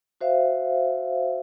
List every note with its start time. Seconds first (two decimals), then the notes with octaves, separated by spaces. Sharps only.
0.21 F#4 C5 E5 F5